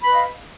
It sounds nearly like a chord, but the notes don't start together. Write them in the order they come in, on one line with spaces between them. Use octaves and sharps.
B5 B4 D#5 F5